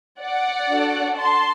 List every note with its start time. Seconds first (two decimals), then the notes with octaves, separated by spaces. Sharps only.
0.20 D5 F#5
0.69 D4 F#4 A4
1.16 A5 C6